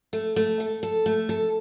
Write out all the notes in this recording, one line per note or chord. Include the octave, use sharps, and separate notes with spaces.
A3
A3
A4
A4
A3
A4